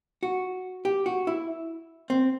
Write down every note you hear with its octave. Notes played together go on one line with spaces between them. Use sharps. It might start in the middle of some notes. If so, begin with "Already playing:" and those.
F#4
G4
F#4
E4
C4